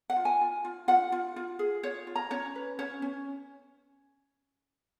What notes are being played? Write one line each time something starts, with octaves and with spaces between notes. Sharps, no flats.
F#5
F4
G#5
F4
F4
F4 F#5
F4
F4
G#4
F4 C#5
F4
A#5
C#4 C#5
B4
C#4 C#5
C#4